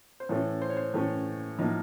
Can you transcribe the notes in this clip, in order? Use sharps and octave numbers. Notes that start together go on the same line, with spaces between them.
C5
A2 E3 A3 C#4 C#5
C5
C#5
C5
A2 E3 A3 C#4
A2 F3 A#3 D#4